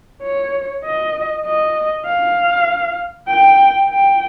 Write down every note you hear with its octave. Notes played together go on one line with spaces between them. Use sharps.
C#5
D#5
D#5
F5
G5
G5